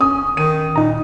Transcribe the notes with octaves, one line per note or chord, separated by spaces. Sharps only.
C#4 D#6
D#3 D#7
A#2 D#4 A#5